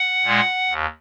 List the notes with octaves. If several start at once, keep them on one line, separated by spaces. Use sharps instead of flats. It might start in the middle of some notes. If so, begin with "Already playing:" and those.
Already playing: F#5
A#2 G#3
D#2